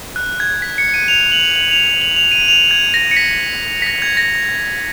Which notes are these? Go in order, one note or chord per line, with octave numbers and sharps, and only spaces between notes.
F#6
G#6
B6
C#7
D#7
F7
F#7
F#7
F7
F7
F#7
F7
D#7
F7
G#6
A#6
C#7
B6
B6
A#6
G#6
A#6